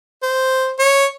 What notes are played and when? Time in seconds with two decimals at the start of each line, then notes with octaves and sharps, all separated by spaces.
0.23 C5
0.79 C#5